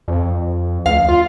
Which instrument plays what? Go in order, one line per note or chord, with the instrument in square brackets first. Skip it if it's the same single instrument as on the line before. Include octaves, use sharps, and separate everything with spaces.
[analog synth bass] F2
[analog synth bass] D2 [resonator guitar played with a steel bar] F5
[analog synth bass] F4